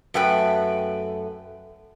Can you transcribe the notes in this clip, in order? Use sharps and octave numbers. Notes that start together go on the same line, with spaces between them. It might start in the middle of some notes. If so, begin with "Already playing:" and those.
F#2 A3 B4 G5